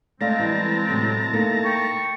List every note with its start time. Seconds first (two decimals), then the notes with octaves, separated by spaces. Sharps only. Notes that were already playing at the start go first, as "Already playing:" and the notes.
0.21 G#3 A3 C4 D5 F5 A5 A#5
0.39 E3 G3
0.89 A2 C3 F#3
1.33 A3 A#3 D#4
1.64 G5 C#6